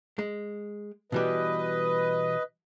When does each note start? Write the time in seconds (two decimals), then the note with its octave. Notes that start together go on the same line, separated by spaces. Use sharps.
0.19 G#3
1.12 B2 E3 G3 B4 D#5